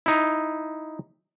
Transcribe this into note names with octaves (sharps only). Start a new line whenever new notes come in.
D#4 E4